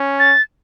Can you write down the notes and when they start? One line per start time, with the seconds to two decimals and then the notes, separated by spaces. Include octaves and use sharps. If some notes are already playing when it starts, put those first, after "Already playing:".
Already playing: C#4
0.19 A6